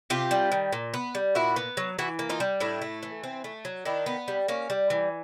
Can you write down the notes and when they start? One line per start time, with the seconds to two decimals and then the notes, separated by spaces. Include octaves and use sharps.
0.10 C3 F4 G4
0.31 G3
0.52 D#3
0.72 A#2
0.94 B3
1.15 G3
1.35 A#2 E4 F#4
1.56 B3
1.77 F#3
1.99 E3 E4 F#4
2.19 A#3
2.29 D#4 F4
2.40 G3
2.60 A2 D4 E4
2.82 A3
3.03 E3
3.24 C4
3.44 A3
3.65 F#3
3.85 D#3 D4 E4
4.06 B3
4.28 G3
4.48 A#3 C#4
4.70 G3
4.90 E3